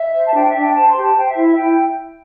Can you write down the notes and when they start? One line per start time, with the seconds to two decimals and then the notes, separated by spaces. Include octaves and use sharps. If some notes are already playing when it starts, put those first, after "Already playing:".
Already playing: E5
0.14 C5
0.25 A5
0.33 D4 G5
0.47 E5
0.54 D4
0.61 G5
0.74 C5 A5
0.88 C6
0.96 G4
1.02 A5
1.16 C5 G5
1.29 E5
1.36 E4
1.43 E5
1.56 E4 G5